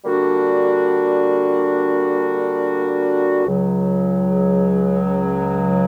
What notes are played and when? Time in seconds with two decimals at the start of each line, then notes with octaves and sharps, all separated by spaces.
0.04 D3 G3 A#3 D4 F#4
3.46 C#2 C#3 F#3